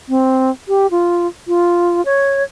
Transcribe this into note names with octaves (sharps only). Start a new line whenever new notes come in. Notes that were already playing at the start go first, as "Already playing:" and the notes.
C4
G4
F4
F4
C#5